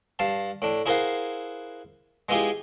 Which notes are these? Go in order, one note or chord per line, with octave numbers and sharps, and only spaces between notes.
G2 F5 A5
A2 D4
E4 G#4 A#4 C5 F5 F#5
G#3 B3 E4 F4 G4 G#4